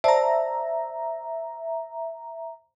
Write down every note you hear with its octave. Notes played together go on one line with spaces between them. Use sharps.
C5 D5 E5 A5 A#5